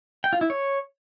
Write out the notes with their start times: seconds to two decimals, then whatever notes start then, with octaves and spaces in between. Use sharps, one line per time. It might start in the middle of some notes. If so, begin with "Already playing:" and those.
0.24 G5
0.33 F4
0.41 E4
0.50 C#5